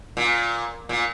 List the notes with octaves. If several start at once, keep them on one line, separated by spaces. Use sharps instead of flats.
A#2
A#2